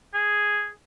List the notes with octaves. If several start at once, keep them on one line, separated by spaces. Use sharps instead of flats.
G#4